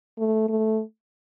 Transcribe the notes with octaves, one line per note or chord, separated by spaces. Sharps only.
A3
A3